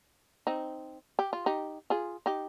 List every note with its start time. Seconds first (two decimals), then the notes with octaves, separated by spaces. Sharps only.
0.47 C4 D#4
1.19 G4
1.33 F4
1.46 D#4 G4
1.90 F4 G#4
2.26 D#4 G4